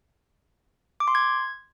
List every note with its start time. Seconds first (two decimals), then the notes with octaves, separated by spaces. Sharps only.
1.00 D6
1.08 C6
1.15 G#6